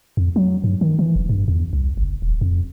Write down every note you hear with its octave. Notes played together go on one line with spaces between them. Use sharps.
F2
F#3
G2
D#3
E3
F1
G2
E2
C2
F#1
D#1
F2